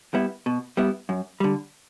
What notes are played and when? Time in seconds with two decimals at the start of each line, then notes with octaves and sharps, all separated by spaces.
0.14 G3 B3 E4
0.46 B2
0.77 G3 B3 E4
1.09 F#2
1.40 D3 G3